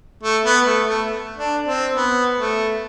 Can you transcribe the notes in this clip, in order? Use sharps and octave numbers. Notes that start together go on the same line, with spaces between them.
A3
B3
A3
A3
D4
C4
B3
A3